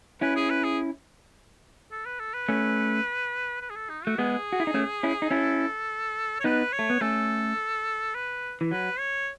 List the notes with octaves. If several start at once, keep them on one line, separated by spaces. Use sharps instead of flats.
C#4 E4 B4
G#4
B4
G#4
A4
B4
A4
B4
A3 C#4
B4
G#4
A4
D#4
A3 F#4
G#3 B3 G#4
F#4
E4
D#4
A3 C#4
C#4 E4
D#4
C#4 E4 A4
C#5
B3 D#4 B4
C#5
A3
B3
A3 C#4 A4
B4
E3
F#3 B4
C#5